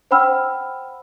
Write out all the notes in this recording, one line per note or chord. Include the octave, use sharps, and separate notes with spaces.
C5 F#5 G5 B5 E6 F6